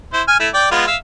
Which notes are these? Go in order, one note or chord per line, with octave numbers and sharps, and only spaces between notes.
E4 C5
G#5 F6
A3 E4
D5 G5
G#3 B3 F4
E5 F5